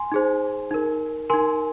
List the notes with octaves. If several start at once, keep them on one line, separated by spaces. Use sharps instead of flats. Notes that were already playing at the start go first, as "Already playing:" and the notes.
Already playing: G#5 C6
D#4 G#4 C5
D#4 A#4
D#4 A#4 G#5 C6